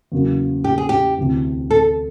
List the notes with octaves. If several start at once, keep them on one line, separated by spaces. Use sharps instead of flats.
E2 C#3 F#3 A#3
G4
G#4
G4
D2 C3 E3
A4